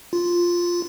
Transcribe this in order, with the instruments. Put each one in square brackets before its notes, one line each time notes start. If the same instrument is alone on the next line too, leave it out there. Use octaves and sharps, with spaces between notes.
[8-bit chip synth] F4